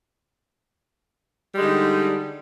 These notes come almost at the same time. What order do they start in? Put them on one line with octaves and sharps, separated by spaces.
G3 G#3 D3 D#4